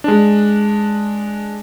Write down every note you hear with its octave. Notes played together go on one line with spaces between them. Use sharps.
G#3 D4